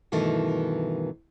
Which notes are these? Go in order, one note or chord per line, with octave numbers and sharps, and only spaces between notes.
G2 B2 D#3 E3 A3